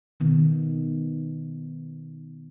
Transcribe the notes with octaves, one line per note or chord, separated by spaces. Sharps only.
B2 D#3 B3